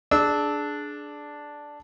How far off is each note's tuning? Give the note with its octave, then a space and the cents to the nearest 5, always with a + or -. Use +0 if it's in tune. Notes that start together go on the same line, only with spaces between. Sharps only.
D4 +0 G#4 +20 E6 -20